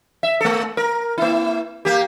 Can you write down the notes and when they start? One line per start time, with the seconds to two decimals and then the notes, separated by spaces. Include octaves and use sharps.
0.23 E5
0.41 A3 A4
0.77 A#4
1.18 A#3 E4
1.85 A#3 G4